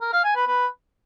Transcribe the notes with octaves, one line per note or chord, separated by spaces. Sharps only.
A#4
F5
G#5
B4
B4